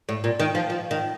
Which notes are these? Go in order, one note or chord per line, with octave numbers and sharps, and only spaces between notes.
A2
A#2
D#3
F3
F3
D#3